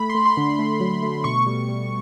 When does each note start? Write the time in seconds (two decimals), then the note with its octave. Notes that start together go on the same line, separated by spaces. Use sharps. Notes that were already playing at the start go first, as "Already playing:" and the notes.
Already playing: A3 B5
0.10 C6
0.15 A3
0.25 C6
0.37 D3
0.59 A3
0.80 F#3
1.02 A3
1.24 B2 C#6
1.47 G3
1.69 G3